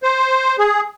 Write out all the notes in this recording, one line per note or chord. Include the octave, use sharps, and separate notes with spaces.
C5
G#4